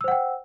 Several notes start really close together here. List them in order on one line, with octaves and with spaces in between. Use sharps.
E6 C5 F#5 G5